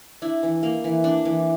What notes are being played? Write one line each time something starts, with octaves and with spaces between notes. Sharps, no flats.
D4 E4
E3
A#3
E3
D4
E3